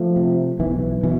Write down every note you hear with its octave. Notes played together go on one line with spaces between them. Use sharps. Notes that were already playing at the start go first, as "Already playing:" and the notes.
Already playing: F3 A3
C3
B1 E3
B2 E3